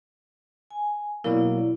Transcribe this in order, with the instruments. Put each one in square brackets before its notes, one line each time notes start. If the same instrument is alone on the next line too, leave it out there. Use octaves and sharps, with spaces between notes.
[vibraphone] G#5
[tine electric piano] B2 F#3 A#3 [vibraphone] E4 D5